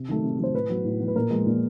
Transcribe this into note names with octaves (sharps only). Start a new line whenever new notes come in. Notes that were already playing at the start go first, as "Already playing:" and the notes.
Already playing: C3
D#3 F#3 A3
C3
D#3 F#3 A3 C5
A2 B4
F#3 B3
A2
F#3 B3
B4
A#2 A#4
F3 G#3 B3
A#2